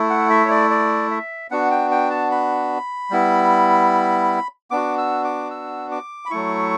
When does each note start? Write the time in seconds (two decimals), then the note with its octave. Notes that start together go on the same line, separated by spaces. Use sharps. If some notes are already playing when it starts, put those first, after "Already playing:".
Already playing: A3 E4
0.10 F#5
0.30 E5
0.45 C#5
0.50 D5
0.70 D5
1.11 E5
1.51 B3 D4 F#4 F#5
1.71 G5
1.91 G5
2.10 A5
2.31 B5
3.11 G3 B3 E4
4.71 B3 D4 F#4 D6
4.98 E6
5.24 D6
5.51 E6
5.92 D6
6.26 B5
6.31 F#3 A3 E4 C#6